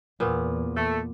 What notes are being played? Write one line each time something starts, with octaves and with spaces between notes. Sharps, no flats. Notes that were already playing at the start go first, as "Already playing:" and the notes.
E2 A#2 B3
A3